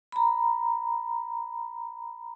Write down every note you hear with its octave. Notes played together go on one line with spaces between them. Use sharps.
A#5 B5